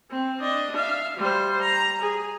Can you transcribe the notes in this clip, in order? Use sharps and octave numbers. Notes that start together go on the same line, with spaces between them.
C4
D4 D#5
E5 F5
G3 C5
A#5
G#4